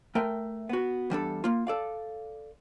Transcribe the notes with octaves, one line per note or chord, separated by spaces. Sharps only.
A3 A#4 G5
B3 F#4
E2 G3 D4 A4
A#3 F4
A4 D5 F5